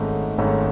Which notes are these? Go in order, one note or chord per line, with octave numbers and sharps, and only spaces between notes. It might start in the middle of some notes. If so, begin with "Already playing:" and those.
Already playing: G#1 G#2 D#3 A3 C#4
G#1 G#2 D#3 A3 C#4